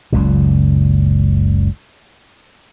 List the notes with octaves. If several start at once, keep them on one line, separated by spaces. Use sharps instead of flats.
F#1 C#2 A#2